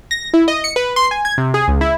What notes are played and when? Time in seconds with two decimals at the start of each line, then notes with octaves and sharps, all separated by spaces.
0.11 A#6
0.34 E4
0.48 D#5
0.64 C#7
0.76 B4
0.96 C6
1.11 G#5
1.25 G#6
1.38 C3
1.54 G#4
1.68 C#2
1.81 E4